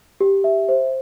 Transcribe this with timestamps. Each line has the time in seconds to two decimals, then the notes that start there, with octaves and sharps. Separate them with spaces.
0.20 G4
0.44 E5
0.69 C5